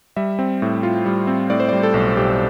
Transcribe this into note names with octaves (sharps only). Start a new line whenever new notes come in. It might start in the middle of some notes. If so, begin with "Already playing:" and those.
G3 E5
C4
A2
F4
G3
C4
A2 D5
C5
G3 D5
A4
B1
B1 G4